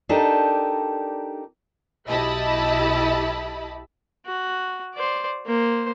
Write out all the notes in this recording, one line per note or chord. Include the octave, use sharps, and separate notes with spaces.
D4 D#4 G4 A4 A#4 D5
B1 E4 G4 D#5 A5 B5
F#4
C5 D5
A#3 C5